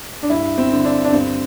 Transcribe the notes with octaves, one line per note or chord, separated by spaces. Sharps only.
D4
G2 E4
C4
D3
D4
D4
G2 C4